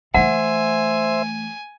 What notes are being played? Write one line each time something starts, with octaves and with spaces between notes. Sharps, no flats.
E3 A3 C5 E5 F#5 G#5